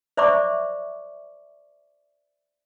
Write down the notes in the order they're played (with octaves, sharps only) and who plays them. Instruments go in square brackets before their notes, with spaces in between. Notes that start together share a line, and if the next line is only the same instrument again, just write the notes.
[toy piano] C5 D5 E5 B5 C#6 D6